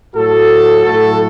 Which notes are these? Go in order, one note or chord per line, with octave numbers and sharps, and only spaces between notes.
A2 F#3 A3 F#4 A4
A2 F#3 A3 F#4 A4